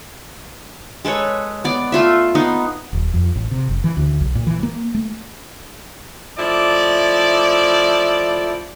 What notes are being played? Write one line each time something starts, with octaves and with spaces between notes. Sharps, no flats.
G#3 A4 B4 C#5
B3 D5
A3 F4 E5
B3 D#4
D#1
F2
A1
C3
F#1
E3
D2
B1
A#2
E3
A#3
A3
F3 A3 E4 D5